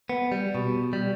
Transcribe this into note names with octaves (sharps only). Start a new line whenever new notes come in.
B3
G3
B2
G3